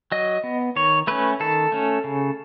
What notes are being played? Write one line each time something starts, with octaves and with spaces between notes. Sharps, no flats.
F#3 D#5
B3
D#3 C#5
A3 C#4 B4
D#3 A4
A3 C#4
C#3